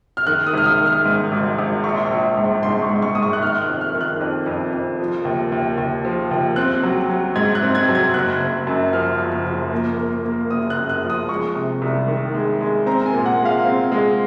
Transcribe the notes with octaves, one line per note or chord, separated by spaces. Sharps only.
F6
D#3 F#6
D#6
G#1 F6
D#6
D#3
F6
G#2
G#1
G#1
A#1 C#6
C6
C#6
A#1
G#2
G#2 C6
C#6
G#2
C#6
G#2 D#6
C#6
F#6
D#3 F6
F#6
F2
F6
D#3
F#6
F2
F2
F2
F3
D#2
D#2
D#2
F3
D#2
C4 F#6
F#3
F#3
G#2 G#6
F#6
C4
G#6
F#3
G#6
F#1 F#6
F#1
F#2
F3 F6
F#1
F3
A#3
A#3
A#3
F#1 D#6
F#6
F#2
F#6
F3
D#6
G#3 C#6
C3
C2
D#3
G#3
G#3
C4 A#5
G#5
A#2
F#5
G#3
F5
C4
G#3